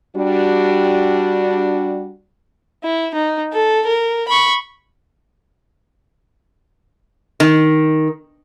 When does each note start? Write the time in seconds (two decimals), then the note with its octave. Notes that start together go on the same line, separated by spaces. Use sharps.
0.16 G3 D4 F#4
2.84 E4
3.15 D#4
3.53 A4
3.87 A#4
4.28 B5 C#6
7.40 D#3